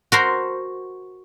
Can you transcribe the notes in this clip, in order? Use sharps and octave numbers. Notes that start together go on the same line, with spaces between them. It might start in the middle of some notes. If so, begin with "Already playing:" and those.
F#4 A#4 C5